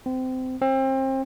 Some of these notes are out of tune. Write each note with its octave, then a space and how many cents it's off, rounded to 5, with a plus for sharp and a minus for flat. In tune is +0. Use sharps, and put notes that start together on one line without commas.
C4 -25
C4 +30